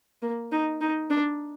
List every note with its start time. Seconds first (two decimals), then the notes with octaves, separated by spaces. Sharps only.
0.22 A#3
0.52 D#4
0.81 D#4
1.10 D4